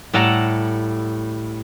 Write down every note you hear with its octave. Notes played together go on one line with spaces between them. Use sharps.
A2 G3 A4 F#5 A5 A#5